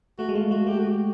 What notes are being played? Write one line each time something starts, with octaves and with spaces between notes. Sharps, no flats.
A3 F#4
G#3
A3 F4
A3 F#4
A3 G4
F#4
G#3
G4